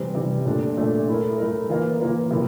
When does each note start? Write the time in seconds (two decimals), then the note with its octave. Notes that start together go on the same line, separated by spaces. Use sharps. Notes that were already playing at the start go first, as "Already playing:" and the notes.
Already playing: C3 E3 G3 C4
0.15 C3 E3 G3 C4
0.45 A#2 A3 D4
0.77 A#2 A3 D4
1.08 A3 E4 A#4
1.38 A3 E4 A#4
1.69 E3 A#3 F4 A#4
2.00 E3 A#3 F4 A#4
2.31 C3 F3 A#3 E4